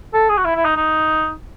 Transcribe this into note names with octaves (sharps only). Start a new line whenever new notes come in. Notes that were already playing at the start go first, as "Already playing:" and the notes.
A4
G#4
F#4
E4
E4
D#4
D#4